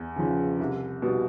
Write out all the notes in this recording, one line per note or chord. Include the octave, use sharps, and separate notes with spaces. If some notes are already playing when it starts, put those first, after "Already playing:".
Already playing: E2
C#3 F3
C2
B2 G3